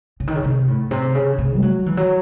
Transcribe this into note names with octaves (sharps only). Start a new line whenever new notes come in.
C#3
D#3
C#3
C3
A2
C3
C#3
C3
G#3
F#3
E3
F#3